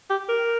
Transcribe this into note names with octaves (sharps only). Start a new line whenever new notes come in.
G4
A#4